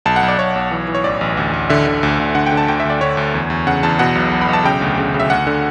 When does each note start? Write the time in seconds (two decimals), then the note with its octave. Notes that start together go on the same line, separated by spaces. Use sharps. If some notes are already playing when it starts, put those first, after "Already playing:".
0.06 B1 A5
0.16 F#5
0.23 B1
0.28 D5
0.38 B1 C#5
0.56 B1
0.71 E3
0.88 E3
0.95 C#5
1.04 A1 D5
1.21 A1
1.37 D2
1.53 D2
1.70 D3 E5
1.87 D3
2.03 D2
2.20 D2
2.35 D3 F#5
2.46 G5
2.52 D3
2.57 A5
2.68 D2 G5
2.80 E5
2.85 D2 D5
3.01 D2 C#5
3.17 D2
3.34 E2
3.50 E2
3.67 C#3 F#5
3.83 E2 A5
3.99 B2 F#5
4.15 B1
4.32 B1
4.41 B5
4.49 B1 A5
4.64 C#3 G5
4.81 D2
4.98 C#3
5.14 C#3
5.20 E5
5.30 D2 F#5
5.47 D3